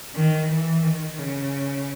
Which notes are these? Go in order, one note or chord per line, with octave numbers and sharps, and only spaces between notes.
D#3
E3
D#3
C#3